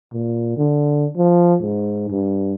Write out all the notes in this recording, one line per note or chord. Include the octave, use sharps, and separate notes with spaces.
A#2
D3
F3
G#2
G2